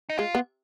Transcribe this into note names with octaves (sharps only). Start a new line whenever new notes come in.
D#4
G#3 F4
B3